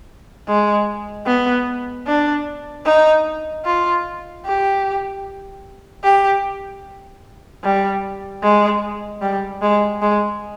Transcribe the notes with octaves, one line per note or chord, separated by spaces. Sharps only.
G#3
B3
D4
D#4
F4
G4
G4
G3
G#3
G3
G#3
G#3